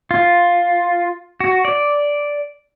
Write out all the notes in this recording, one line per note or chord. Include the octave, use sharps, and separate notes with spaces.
F4
F#4
D5